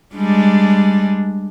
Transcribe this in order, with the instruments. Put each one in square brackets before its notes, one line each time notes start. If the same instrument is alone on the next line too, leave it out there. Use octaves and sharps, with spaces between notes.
[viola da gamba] G3 G#3 D4